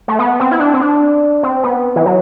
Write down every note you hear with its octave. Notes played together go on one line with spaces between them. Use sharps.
A3
B3
C4
E4
D4
C4
D4
C4
B3
E3
F#3